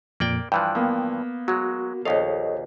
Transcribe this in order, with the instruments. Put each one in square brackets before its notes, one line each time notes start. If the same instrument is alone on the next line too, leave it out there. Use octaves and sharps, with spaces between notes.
[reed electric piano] F2 A#2 [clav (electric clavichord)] A#3 D5 G5
[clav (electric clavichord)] G2 E3 F3 [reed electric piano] G5 F#6
[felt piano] A#3 B3
[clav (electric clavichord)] F#3 G#3 [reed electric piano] F#4
[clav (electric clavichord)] A#1 D#2 F5 [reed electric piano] A4 C#5 D#5